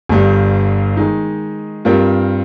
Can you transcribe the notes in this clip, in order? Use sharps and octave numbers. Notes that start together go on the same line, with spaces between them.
G1 G2 G3
D#3 G#3 D#4
G2 G3 C4 F4 A#4